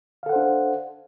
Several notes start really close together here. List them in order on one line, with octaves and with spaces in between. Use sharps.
F5 A4 F#5 C5 D4